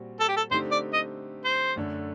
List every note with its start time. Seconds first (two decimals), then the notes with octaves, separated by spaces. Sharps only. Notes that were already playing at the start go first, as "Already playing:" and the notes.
Already playing: A#2 G3 C4 F#4
0.20 A4
0.28 G4
0.37 A4
0.51 D3 A3 C4 D#4 G4 C5
0.71 D5
0.93 D#5
1.45 C5
1.76 F#2 D3 A3 D4